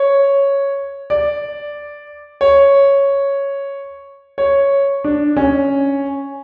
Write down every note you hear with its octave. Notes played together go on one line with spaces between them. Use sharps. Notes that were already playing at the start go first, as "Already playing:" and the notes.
Already playing: C#5
D5
C#5
C#5
D4
C#4